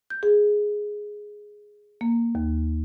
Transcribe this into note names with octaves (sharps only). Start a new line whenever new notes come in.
G6
G#4
A#3
D#2